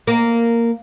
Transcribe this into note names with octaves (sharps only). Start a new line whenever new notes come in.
A#3